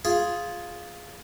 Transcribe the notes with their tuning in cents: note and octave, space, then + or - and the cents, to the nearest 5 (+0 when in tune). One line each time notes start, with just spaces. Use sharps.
F4 +0 G#4 +0